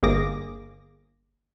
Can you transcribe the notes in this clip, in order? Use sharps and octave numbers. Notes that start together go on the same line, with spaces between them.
G1 A#3 G#4 D6 A#6